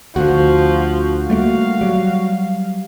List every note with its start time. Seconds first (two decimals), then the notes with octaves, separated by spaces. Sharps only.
0.16 D2 D3 F3 F#4
1.30 G3 A3 A#3 F5
1.81 F#3 G3